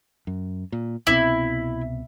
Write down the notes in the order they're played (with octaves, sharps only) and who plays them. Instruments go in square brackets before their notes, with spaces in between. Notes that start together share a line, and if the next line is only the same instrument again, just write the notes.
[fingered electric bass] F#2
A#2
[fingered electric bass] C2 B2 C4 [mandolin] E4